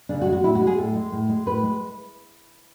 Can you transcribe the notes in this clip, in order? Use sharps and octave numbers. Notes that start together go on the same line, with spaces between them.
C#3 D4
F#4
G#3
F#4
A2 E4
F#4
G#3
G#4
A2 A4
G#3
A2
G#3
A2 B4
G#3